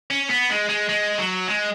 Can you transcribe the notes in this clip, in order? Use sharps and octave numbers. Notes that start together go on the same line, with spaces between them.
C#4
B3
G#3
G#3
G#3
F#3
G#3